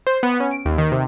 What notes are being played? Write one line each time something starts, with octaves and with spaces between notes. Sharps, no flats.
C5
B3
C#4
D7
D#2
D#3
C3